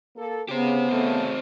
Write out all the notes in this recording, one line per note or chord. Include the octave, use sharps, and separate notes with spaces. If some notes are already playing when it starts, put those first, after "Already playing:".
A#3 A4
C#3 B3 G4 C5
C#3 A3 C4 D#4